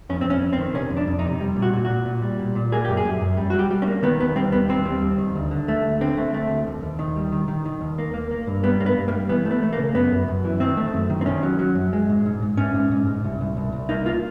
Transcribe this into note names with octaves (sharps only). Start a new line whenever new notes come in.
F2 C#4
C4
F2
C#4
F2
C4
D#3
C3 C#4
F2
D4
F2
D#4
C3
G3
A#2
F#4
A#2
A#2 F#4
A#2
G3
A#2
A#2
A#3 G#4
F#2 G4
G#4
F#2
F#2
G3
G3 F#4
G4
G3
C#4
A#3
D#3 B3
D#2 B3
G3 C4
D#2 B3
G3 C4
G3
D#2
D#3
D2
D3
A3
D2
D3 C4
A3
A3
D2
D#2
D#2
D#3
G3
D#3
D#3
D#3
D#2
A#3
A#3
A#3
G2
G3 B3
G2 A#3
B3
G2
A#3
G3
E3 B3
A3
B3
A3
A#3
C#3
F#2 B3
F#2
F#2
E3
D#3 C4
A3
F#2
D#3
C4
D#3 C#4
F#3
F#3
F#2
G#3
G#2
G#2
G#2
G#2 C#4
G#2
G#2
G#2
C2
C2
C2
C2
A#3 D#4
A#3 F4